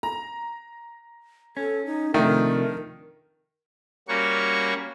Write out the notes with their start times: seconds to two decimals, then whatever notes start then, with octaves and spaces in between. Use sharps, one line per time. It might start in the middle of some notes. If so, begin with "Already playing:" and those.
0.03 A#5
1.57 C#4 A4
1.86 D#4
2.14 C3 D#3 F3 A3 D4 A#4
4.08 G3 A#3 C#4 F#4 C#6